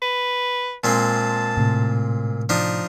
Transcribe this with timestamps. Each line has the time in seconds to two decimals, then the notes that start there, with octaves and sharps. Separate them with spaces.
0.02 B4
0.84 A#2 G#3 C4 A5
1.57 A2 C3
2.49 F3 D4 D#4